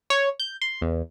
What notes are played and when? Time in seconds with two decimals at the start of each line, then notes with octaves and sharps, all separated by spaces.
0.10 C#5
0.40 G6
0.61 C6
0.82 E2